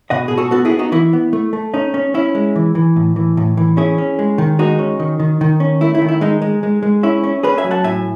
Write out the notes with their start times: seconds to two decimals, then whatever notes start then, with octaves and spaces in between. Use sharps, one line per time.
0.10 B2 D#5 F#5
0.28 B2 G#4
0.37 F#4 A4
0.51 B3 F#4 A4
0.65 E4 G#4
0.71 B3
0.79 D#4 F#4
0.92 E3 E4
1.13 B3
1.33 A3
1.53 A3
1.74 C#4 D#4
1.94 C#4
2.14 C#4 E4
2.35 G#3
2.56 E3
2.75 E3
2.96 A2
3.16 E3
3.37 A2
3.57 E3
3.77 C#4 E4 G#4
3.98 C#4
4.19 G#3
4.38 D#3
4.59 G#3 D#4 F#4
4.79 C#4
5.00 D#3
5.20 D#3
5.41 D#3
5.60 C#4
5.81 A3 E4
5.95 E4
6.02 D#3
6.08 E4
6.21 G#3 D#4
6.42 G#3
6.63 G#3
6.83 G#3
7.03 C#4 E4
7.23 C#4
7.43 C#4 G#4 B4
7.58 E5 G#5
7.64 F#3
7.71 F#5 A5
7.84 A2 E5 G#5